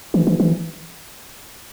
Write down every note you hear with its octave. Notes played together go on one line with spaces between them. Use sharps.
E3
E3
E3